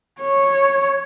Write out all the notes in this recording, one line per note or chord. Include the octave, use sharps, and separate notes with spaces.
C#5